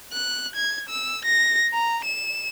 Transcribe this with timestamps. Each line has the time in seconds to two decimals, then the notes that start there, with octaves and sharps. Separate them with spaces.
0.13 F#6
0.56 G#6
0.89 E6
1.25 A#6
1.73 A#5
2.05 E7